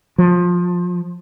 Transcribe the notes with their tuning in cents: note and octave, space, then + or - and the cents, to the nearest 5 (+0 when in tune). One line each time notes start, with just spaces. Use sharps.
F3 +20